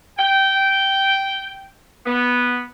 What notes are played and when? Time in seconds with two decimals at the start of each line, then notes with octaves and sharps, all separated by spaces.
0.18 G5
2.06 B3